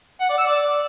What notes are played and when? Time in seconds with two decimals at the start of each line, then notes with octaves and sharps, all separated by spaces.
0.20 F#5
0.29 D5
0.38 E6
0.47 D5